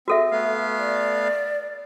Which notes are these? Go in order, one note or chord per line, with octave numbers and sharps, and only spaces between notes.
C4 F#4 A4 E5
A3 B3 F5
D5